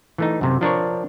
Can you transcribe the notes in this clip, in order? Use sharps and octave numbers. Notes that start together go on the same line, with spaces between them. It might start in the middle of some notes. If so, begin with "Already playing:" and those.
E3 A3 D#4
F#2 C3
F3 D4 A#4 C#5